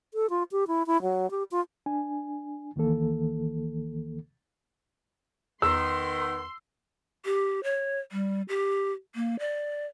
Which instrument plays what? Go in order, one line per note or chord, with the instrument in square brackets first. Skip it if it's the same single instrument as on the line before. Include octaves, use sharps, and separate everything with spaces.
[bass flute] A4
F4
G4
E4
E4
F#3
G4
F4
[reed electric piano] D4 G#5
D2 D#3 E3 A#3 A4
[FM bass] E2 [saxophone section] D#3 B3 [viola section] C6 [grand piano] E6
[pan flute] G4
C#5
G3
G4
A#3
D5